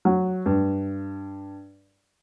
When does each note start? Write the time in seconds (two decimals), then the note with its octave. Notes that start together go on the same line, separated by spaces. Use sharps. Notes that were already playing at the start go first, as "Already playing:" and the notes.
0.05 F#3
0.46 G2